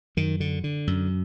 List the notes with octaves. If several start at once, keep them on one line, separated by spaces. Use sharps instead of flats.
F#2 D#3
D3
D3
F#2